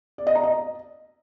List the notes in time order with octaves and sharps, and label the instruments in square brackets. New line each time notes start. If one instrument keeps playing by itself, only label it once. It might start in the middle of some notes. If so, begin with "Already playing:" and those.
[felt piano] D5
D#5
A#5
D#5